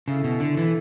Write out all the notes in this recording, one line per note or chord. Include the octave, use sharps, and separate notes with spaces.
C#3 E4 A4 E5
B2
D3
E3 E4 A4 E5